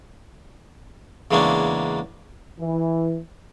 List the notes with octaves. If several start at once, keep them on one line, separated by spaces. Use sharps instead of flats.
E2 C#3 G#3 A#3 C#4 D4
E3